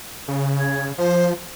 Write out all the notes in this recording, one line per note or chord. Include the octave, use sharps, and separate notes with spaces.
C#3
G#6
F3 C5